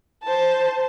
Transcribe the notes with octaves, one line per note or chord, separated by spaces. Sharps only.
C5 A5